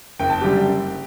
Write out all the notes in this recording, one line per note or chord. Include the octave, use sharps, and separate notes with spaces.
F#1 G5
A5
F#2 D3 G3 G4 G5
F#1